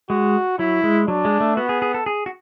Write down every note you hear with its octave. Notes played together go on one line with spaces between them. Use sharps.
G#3 F#4
F#3 E4
G#3
F#3 D4
G#3
A3
B3 F#4
G#4
G#4
A4
G#4
F#4